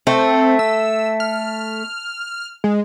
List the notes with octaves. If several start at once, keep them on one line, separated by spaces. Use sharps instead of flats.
A3 C4
E6
F6
G#3